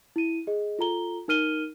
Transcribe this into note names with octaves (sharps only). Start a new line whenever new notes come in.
E4 D#7
G#4 D#5
F4 A4 A#5 G7
D#4 A#4 F6 D#7 G7